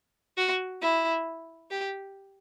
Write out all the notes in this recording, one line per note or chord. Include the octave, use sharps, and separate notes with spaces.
F#4
E4
G4